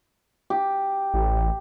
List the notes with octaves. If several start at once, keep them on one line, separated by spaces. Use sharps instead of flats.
G4
A1